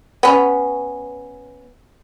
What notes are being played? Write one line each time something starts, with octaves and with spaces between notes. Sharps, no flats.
B3 C#4